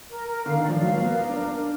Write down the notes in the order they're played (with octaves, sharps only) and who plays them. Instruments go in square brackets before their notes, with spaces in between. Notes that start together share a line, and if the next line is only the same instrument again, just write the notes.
[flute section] A#4
A#4
[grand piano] D3 [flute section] F5
[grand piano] D#3
[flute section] D5
[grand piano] F3
[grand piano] F#3 [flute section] F5
[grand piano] A#3
[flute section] A#4
[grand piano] B3
[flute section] A#4
[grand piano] D4
[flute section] A#4
[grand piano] D4
[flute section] A#4